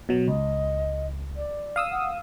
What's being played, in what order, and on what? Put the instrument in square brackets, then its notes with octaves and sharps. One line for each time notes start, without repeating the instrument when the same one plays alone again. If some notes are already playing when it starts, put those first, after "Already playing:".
[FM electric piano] B2 F#3
[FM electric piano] C#2 [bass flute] D#5
[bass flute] D5
[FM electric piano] F5 D#6 E6
[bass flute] F#5